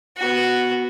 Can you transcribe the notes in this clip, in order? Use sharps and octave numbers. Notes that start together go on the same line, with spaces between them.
B3 F#4